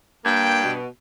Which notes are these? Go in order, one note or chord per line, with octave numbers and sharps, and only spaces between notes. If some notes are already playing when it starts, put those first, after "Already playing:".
G2 A#3 G5
B2